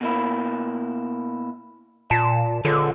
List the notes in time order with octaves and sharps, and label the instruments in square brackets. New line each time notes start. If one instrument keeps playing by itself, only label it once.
[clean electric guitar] B2 A#3 E4
[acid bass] A#2 [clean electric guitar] A5
[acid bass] D3 [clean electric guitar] F4 G#4 C#5